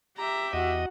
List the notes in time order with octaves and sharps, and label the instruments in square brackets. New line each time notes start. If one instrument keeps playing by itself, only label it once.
[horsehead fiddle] G4 E5 [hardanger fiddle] A#5
[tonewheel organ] E2 D#5 [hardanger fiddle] F#4